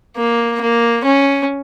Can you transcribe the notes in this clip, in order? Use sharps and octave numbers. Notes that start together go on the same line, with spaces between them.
A#3
A#3
C#4